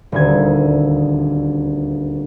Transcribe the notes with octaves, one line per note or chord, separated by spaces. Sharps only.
D#1 D2 G#6